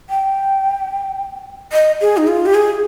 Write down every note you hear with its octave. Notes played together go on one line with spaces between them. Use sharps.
G5
D#5
G#4
D#4
F4
G4
G#4